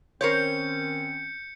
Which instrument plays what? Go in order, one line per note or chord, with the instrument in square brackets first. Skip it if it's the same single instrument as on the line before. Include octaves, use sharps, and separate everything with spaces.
[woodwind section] D#3 C4 C#4 [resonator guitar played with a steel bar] A#4 C5 C#5 [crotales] G6 C#7